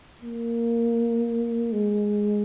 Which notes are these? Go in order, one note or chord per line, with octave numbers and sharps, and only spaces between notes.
A#3
G#3